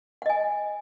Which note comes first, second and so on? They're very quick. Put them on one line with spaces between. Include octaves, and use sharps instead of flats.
F#5 D#5 G#5